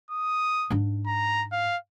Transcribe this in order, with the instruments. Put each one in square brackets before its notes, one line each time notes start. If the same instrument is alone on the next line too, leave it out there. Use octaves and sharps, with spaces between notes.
[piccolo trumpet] D#6
[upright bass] G#2 D4
[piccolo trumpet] A#5
F5